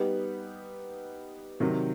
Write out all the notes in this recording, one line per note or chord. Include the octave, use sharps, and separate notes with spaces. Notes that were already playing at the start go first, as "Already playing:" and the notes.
Already playing: G3 B3 D#4 G4
C3 D#3 F#3